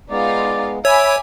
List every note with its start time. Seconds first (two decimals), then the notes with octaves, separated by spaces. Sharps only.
0.10 G#3 B3 D#4 F4 D5 F5
0.85 C#5 E5 G#5 B5 D6